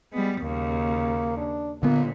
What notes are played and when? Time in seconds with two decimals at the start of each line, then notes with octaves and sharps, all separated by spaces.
0.13 G3 G#3 B3
0.43 D#2 C#3 A#3
1.37 D4
1.83 A#2 D3 A#3 B3